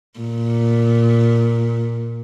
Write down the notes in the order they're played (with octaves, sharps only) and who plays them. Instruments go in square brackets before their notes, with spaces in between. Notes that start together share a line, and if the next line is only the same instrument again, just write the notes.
[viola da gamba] A#2